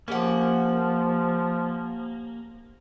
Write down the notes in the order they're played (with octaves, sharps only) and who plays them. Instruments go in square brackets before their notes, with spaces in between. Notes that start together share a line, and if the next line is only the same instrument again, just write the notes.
[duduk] F3 [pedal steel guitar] A#3 [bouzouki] C#4 G4 F#5